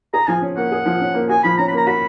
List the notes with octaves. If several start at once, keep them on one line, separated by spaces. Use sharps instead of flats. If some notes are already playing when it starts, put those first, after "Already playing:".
G#4 A#5
F3 G#5
C#4
A#3 F#5
G#4
F3
C#4
A#3
F#4 G#5
F3 B5
C#4 A#5
B5
A#3 A#5
F#4 B5